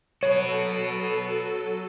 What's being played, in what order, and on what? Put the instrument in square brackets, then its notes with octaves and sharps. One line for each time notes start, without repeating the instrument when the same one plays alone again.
[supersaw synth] F#3 A4 D#7 [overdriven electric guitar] F#4 B4 [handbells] C#5